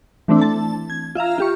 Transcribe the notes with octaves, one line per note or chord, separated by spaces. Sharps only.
E3 A3 C4 D4 E4
A5
G#6
F4 E5 F5 A#5
F4 G4 C#6